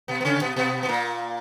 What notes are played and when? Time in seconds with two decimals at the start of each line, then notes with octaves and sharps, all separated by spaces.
0.08 B2 B3
0.21 B3
0.25 C#3 C#4
0.41 B2 B3
0.56 B2 B3
0.83 B3
0.89 A#2 A#3